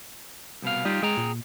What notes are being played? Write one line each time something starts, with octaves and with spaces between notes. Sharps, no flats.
C2 B2 F5
G3 D#4 F4 G4
G#3 G#4 G5 A#5
A#2